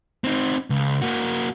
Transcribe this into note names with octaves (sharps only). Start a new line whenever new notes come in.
C4 D#4
C#2
A#3 F#4